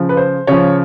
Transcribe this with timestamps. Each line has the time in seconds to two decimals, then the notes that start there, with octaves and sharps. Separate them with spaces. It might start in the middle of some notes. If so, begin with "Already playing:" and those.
Already playing: C#3 F3
0.09 B4
0.17 C5
0.47 C#3 F3 C#5